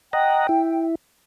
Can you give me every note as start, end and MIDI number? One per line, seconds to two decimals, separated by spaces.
0.13 0.47 75
0.13 0.47 78
0.13 0.82 79
0.13 0.47 82
0.49 0.95 64